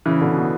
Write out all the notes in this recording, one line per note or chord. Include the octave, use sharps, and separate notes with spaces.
C#3 E3
B2 D3
B2